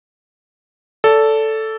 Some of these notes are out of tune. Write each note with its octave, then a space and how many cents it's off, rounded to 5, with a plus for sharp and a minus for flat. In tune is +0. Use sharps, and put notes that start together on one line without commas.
A4 +0 D5 -35